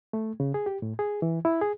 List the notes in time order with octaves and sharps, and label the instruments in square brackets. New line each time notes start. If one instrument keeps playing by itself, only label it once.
[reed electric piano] A3
C#3
G#4
G4
A2
G#4
E3
E4
G#4